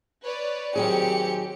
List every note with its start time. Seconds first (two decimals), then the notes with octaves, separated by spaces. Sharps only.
0.24 B4 C#5 D5
0.76 D#3 F#3 C4 G4 G#4 C#7